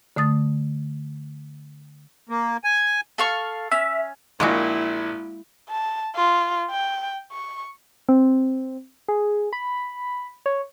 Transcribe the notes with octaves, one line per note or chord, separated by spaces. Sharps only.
D3 A3 D#6 A6
A#3
G#5
A4 F5 C#6
C#4 E5
A#1 A#2 G#3 A#3 E4 F#4
A5
F4
G5
C#6
C4
G#4
B5
C#5